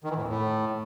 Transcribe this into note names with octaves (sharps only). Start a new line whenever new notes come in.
D#3
E3
A2
F2
A2